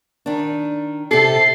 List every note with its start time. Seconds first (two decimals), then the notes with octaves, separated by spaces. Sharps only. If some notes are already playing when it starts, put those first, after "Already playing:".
0.26 D#3 D4
1.11 C3 G4 A4 C7